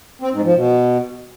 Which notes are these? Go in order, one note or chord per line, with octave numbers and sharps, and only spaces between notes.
C4
G#2
F3
B2